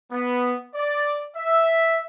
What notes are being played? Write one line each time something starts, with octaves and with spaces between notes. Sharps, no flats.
B3
D5
E5